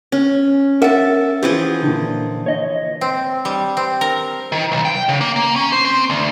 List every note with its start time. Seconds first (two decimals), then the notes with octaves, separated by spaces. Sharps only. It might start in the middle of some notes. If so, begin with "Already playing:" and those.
0.12 C#4
0.82 A#4 E5 F#5 A5
1.43 E3 F3 G4 G#4
1.83 A#2 D3
2.46 C#5 D#5
3.01 C4
3.45 G3
3.77 C4
4.01 A#4
4.52 D#3
4.72 B1
4.85 G5
5.09 C#3
5.21 A#3
5.36 A#3
5.56 C#4
5.72 C5
5.85 C4
6.10 D2